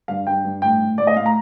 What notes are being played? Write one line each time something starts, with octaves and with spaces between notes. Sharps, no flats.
G2 F5
G2 G5
G2
A2 G5
A2
A2 D5
D#5
A2 F5
A#5